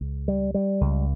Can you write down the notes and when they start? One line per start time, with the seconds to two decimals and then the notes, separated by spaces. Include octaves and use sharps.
0.01 C#2
0.28 G3
0.54 G3
0.81 C#2